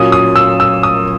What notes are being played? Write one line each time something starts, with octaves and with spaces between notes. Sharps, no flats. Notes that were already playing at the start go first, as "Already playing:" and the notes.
Already playing: A#2 F#3 C#4 D#6
D#6
E6
E6
D#6